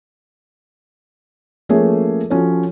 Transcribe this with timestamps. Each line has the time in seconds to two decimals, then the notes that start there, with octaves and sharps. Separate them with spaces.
1.69 F3 A3 A#3 C#4 G#4 C#5
2.30 F3 C#4 F#4 A4 C#5